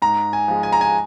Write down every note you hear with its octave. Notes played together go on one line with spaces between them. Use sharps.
G#2 A#5
G#5
F3 G#3
G#5
A#5
G#5